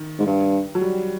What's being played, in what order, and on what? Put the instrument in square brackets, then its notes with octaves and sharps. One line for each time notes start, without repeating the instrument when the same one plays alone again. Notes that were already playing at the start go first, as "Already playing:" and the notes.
Already playing: [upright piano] D#3
[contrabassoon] G#2
G2
[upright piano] F#3
G3